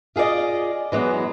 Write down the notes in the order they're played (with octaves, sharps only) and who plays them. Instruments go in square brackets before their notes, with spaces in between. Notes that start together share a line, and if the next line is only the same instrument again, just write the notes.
[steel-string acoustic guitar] F4 G#4 A4 D5 D#5
E3 F#3 G#3 B3